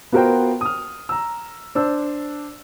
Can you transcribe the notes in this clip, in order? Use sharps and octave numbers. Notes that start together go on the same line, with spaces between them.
B3 F4 F#4 A#4 C5 G5
D#6 F6
A#5 E6
D4 C5 E6